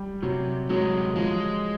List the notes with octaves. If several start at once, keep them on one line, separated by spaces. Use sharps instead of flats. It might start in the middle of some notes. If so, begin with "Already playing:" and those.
Already playing: G3
C3 F#3
F#3 G#3
F3 G#3